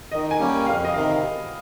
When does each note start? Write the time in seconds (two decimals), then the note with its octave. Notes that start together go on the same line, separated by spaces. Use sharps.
0.12 D#3 D#5
0.31 G#5
0.39 G3 A#3 C#4
0.48 G5
0.67 F2 F5
0.85 D#5
0.94 C3 D#3 F5